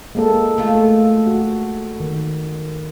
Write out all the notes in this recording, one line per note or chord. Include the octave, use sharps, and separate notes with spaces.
G#3 A#3 A4
A3 F4
A4
F#4
D#3